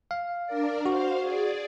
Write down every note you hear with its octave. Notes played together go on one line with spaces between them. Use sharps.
F5
D4 A#4 D5
F#4 C5 F5
G#4 D5